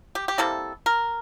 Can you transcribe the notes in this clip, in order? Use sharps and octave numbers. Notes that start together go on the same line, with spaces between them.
G4
G4
C3 G3 A#3 E4 A4
A#4